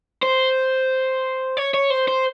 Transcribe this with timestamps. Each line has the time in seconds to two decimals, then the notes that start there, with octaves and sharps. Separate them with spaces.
0.22 C5
1.57 C#5
1.74 C#5
1.90 C5
2.08 C5